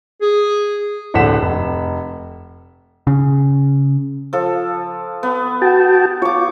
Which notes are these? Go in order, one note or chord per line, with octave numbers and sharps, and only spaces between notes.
G#4
D1 A#1 D3 F#5 B6 E7
F1
C#3
F3 A4
B3
F#4 G5 A5
F4 C#5 D6